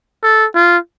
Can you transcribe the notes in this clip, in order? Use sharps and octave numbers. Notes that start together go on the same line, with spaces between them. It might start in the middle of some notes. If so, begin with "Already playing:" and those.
A4
F4